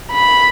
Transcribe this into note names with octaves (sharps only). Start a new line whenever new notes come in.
B5